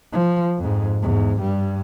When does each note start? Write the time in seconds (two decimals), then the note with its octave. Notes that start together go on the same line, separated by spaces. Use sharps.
0.12 F3
0.58 F2 G#2
1.02 E2 G#2
1.39 G2 G3